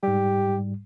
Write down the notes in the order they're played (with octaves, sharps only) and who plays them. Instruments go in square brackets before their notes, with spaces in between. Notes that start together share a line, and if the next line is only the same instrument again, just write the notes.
[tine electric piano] G#2 G3 [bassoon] G4